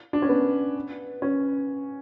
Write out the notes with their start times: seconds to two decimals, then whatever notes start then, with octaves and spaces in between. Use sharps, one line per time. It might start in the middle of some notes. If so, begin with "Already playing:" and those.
0.13 D4
0.22 C#4
0.29 B3
1.22 C#4